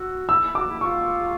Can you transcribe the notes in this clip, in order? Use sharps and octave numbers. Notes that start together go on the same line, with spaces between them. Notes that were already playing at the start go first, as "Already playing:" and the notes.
Already playing: F#4 E6
E4 E6
E4
F#4 D6
E4
F4 C#6